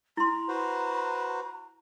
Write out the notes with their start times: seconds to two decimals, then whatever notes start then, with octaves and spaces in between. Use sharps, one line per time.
0.17 E4 A#5 C6
0.48 F#4 B4 C5